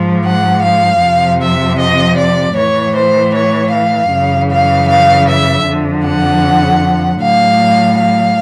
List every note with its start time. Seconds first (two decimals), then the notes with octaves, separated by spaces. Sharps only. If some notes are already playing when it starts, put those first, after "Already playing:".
Already playing: G#2 F3
0.24 F#5
0.62 F5
1.02 F2 C3 F3
1.41 E5
1.79 D#5
2.17 D5
2.56 A2 E3 C#5
2.95 C5
3.34 C#5
3.72 F5
4.11 F#2 C#3 E3
4.51 F5
4.88 F5
5.27 E5
5.67 F2 D3 F3
6.04 F#5
7.20 A2 F#3 F5
7.98 F5